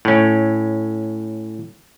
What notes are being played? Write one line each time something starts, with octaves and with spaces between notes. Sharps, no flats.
A2 C#4